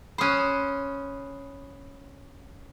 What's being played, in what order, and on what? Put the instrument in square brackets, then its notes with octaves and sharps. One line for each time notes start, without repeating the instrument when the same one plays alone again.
[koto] C#4 C5 [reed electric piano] B5 D#6 F#6